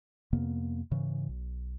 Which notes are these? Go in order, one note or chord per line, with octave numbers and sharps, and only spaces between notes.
F2 C3 A#3 B3
G#2 C#3 E3
B1